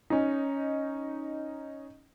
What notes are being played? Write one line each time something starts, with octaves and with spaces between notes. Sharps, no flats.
C#4 D#4